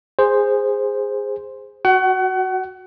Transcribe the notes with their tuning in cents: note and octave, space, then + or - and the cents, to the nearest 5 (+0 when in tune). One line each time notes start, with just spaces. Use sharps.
G#4 -15 C5 +0
F#4 +0 F#5 +30